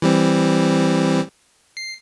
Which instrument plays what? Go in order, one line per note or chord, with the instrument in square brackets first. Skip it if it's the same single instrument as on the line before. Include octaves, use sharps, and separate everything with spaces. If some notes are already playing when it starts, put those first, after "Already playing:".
[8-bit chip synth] E3 G3 C4
C7